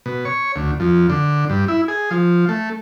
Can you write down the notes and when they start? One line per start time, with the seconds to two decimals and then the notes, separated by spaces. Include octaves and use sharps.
0.06 B2
0.25 C#5
0.56 D2
0.80 F2
1.10 D3
1.50 G2
1.68 E4
1.88 G#4
2.11 F3
2.49 A3